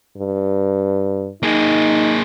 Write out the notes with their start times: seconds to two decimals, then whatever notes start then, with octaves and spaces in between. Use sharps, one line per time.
0.18 G2
1.43 A#3 D#4 G#4